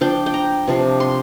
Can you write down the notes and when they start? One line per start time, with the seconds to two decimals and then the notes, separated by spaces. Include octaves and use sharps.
0.01 F3 D4 G5
0.26 G5
0.34 A#5
0.67 C3 F3 D4
1.00 C6